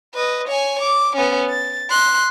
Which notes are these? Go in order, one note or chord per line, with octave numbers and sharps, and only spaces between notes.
B4 D#5
C#5 G#5
D6
B3 C#4
A6
C6 F#6